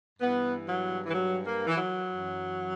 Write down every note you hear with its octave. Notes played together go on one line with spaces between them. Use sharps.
G2 E3 B3
F#3
E3
F#3
A#3
E3
F#3
F#2 E3